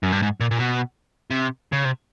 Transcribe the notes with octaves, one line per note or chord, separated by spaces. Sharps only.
F#2
G2
G#2
A#2
A#2
B2
C3
C#3
C3